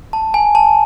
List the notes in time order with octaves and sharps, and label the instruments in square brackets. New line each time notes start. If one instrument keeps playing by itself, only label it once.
[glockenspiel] A5
G#5
A5